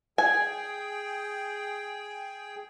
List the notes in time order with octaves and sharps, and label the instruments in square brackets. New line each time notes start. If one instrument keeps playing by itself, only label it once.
[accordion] G#4 G5 [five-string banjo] G#5